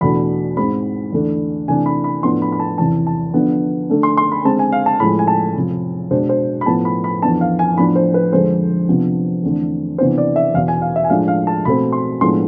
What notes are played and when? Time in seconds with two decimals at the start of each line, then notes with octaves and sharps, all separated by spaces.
0.01 E2 B2 A3 D4 B5
0.57 G#2 G#3 C4 B5
1.12 E2 D3 A3 D4
1.68 C3 E3 A3 D4 G#5
1.86 B5
2.04 B5
2.23 A2 F3 B3 D4 C6
2.42 B5
2.52 B5
2.60 A5
2.78 E2 C3 E3 A5
3.07 A5
3.34 D3 F3 B3 D4
3.89 D3 A3 D4
4.03 C6
4.17 C6
4.32 B5
4.45 D3 G#3 C4 A5
4.59 G#5
4.72 F5
4.86 A5
5.00 A2 F3 G#3 B5
5.19 G#5
5.28 A5
5.55 F2 C3 F3
6.11 B2 G#3 D4 C5
6.29 C5
6.61 B5
6.66 A2 F3 B3 A5
6.85 B5
7.04 B5
7.22 F2 E3 B3 D4 A5
7.41 F5
7.59 G#5
7.77 A2 F3 B3 D4 B5
7.96 C5
8.14 B4
8.32 F2 D3 G#3 D4 C5
8.88 C3 F3 B3 D4
9.44 E2 D3 A3 C4
9.98 C3 E3 B3 D4 C5
10.18 D5
10.36 E5
10.54 E2 B2 B3 F5
10.68 G#5
10.82 F5
10.96 E5
11.04 G#5
11.09 A2 F3 G#3 D4 F5
11.28 F5
11.47 A5
11.65 B2 A3 C4 B5
11.92 C6
12.21 A2 F3 G#3 B3 D4 C6